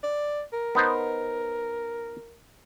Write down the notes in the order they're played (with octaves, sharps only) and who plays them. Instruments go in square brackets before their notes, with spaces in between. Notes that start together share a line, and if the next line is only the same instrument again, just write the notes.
[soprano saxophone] D5
A#4
[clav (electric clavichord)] B3 D#4 C5